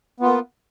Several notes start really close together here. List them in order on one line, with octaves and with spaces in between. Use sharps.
B3 F4 A#3